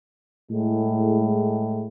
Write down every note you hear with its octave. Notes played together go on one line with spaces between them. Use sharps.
A2 G#3